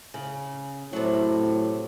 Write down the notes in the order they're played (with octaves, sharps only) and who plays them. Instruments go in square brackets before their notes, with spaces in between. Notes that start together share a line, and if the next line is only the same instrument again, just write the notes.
[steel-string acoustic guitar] C#3
[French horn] A2 [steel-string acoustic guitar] C3 F#3